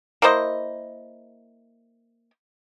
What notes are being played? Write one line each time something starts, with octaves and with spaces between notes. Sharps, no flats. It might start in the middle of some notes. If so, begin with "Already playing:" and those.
A#3 E4 C5 D#5